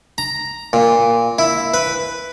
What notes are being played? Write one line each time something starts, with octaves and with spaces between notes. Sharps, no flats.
A#5
A#2
E4
B4